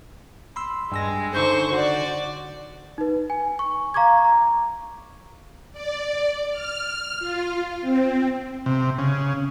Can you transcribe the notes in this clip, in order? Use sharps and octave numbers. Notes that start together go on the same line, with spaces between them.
B5 C6 E6
G2 G#3 E6 A#6
D3 D#4 C5 C#6 G6
F#4 D5
D#4 B4
G#5
C#6
F5 A#5 C#6 D6 G#6
A#5
D5
F6
F4
C4
C3
C#3